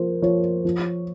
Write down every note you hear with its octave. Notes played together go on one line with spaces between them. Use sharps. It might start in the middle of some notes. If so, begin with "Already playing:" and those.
Already playing: F3 A#3 C5
F3 C#5
F3